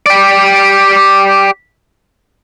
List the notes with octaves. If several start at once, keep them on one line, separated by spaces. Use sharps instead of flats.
G4 D5